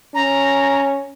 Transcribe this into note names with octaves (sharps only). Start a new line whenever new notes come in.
C#4 A#5